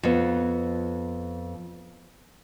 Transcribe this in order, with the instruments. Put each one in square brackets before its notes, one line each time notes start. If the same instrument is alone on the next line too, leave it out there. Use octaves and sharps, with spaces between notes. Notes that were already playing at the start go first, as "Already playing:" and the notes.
[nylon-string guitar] F2 B3